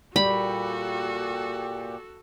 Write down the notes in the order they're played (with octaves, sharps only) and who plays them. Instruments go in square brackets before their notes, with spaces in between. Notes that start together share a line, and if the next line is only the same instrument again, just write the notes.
[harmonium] A#2 G4 [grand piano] G3 [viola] F#4 A4 [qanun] B5